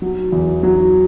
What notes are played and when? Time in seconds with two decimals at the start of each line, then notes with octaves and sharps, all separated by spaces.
0.02 F#3
0.32 E2
0.63 F#3